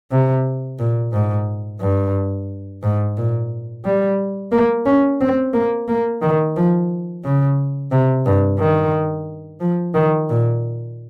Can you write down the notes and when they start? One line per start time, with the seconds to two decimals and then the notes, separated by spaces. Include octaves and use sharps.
0.11 C3
0.79 A#2
1.13 G#2
1.81 G2
2.83 G#2
3.17 A#2
3.85 G3
4.52 A#3
4.86 C#4
5.21 C4
5.53 A#3
5.88 A#3
6.22 D#3
6.56 F3
7.24 C#3
7.91 C3
8.26 G2
8.59 D#3
9.61 F3
9.94 D#3
10.29 A#2